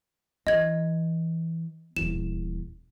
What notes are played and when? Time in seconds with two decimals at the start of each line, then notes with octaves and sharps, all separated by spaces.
0.47 E3 D#5 G#6
1.96 D#1 E2 E7